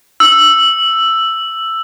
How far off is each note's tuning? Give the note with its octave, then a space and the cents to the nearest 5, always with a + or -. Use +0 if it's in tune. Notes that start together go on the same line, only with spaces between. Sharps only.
E6 +5